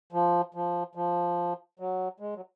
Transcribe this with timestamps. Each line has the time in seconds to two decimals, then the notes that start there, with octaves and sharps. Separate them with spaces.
0.12 F3
0.54 F3
0.95 F3
1.79 F#3
2.20 G#3
2.35 F#3